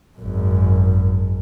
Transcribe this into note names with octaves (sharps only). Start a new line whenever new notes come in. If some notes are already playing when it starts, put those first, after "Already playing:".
G#1 F#2